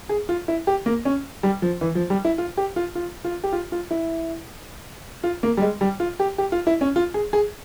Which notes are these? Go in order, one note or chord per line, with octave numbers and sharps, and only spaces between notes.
G#4
F4
E4
G4
A#3
C#4
G3
F3
E3
F3
G3
E4
F4
G4
F4
F4
F4
G4
F4
F4
E4
F4
A#3
G3
G#3
G3
F4
G4
G4
F4
E4
C#4
F4
G#4
G#4